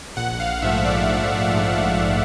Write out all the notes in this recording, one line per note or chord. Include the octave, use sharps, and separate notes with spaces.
A#1 F#5
F5
G#2 F3 A3 E5
D5
A#1
G#2 F3 A3